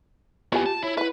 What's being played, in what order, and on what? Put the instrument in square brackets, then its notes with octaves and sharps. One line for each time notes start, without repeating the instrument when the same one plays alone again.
[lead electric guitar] B3 E4 [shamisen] F4 F#5 G#5 [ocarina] G4
[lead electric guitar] A5
[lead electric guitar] E4 [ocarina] C#5
[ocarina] E4 [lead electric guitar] B4 [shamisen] E5 F#5